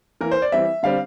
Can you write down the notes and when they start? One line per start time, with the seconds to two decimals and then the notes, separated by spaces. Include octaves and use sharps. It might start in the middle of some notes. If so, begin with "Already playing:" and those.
0.21 E3 A#3 A#4
0.31 C5
0.42 D5
0.52 E3 G3 C4 E5
0.83 D3 G3 C4 F5